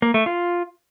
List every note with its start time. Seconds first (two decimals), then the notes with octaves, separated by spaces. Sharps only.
0.02 A#3
0.14 A3
0.26 F4